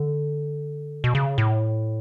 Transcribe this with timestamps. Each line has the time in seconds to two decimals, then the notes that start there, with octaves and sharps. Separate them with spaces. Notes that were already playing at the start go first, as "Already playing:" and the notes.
Already playing: D3
1.04 B2
1.15 C#3
1.38 A2